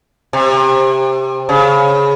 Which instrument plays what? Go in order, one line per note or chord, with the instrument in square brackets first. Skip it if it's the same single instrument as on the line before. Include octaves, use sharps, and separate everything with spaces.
[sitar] C3
C#3